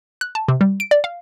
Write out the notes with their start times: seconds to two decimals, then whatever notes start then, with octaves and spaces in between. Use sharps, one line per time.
0.21 F#6
0.35 A5
0.48 C3
0.61 G3
0.80 D7
0.91 D5
1.04 F5